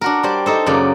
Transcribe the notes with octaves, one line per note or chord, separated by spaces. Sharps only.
D4 F#4 A#4
G3 C5 D5
D#4 A4 C5
F#2 C#3 A#3 D5